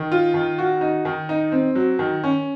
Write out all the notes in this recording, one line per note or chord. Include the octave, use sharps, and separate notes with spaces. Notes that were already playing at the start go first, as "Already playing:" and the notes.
Already playing: D#3
F4
D#3
F#4
D#4
D#3
D#4
C4
F#3
D#3
C#4